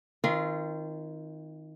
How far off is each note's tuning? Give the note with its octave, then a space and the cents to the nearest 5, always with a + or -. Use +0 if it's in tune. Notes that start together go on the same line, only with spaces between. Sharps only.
D#3 +10 C4 +0 F4 -25